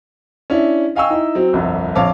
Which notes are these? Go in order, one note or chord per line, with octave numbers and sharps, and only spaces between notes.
C#4 D4 E4
D#5 F5 G5 G#5 C#6 E6
D#4 E4
F#3 C4
G1 C2 F2
A#1 F2 C#5 F5 A5 D6